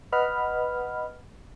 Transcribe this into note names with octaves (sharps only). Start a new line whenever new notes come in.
B4 D#5 F#5 B5 F6